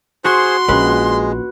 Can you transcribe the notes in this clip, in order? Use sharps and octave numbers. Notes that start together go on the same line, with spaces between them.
F#4 G#4 C5 C6
A#1 G#3 C#4 B4